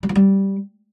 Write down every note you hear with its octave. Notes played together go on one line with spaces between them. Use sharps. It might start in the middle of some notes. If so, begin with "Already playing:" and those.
G3
F3
G3